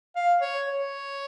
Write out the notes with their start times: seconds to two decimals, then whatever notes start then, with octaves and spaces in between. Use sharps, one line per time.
0.16 F5
0.41 C#5
0.67 C#5